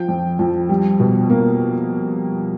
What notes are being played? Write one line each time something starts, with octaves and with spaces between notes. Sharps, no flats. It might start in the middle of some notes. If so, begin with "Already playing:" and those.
Already playing: F3 G5
F2
F2
G3
B2
A#3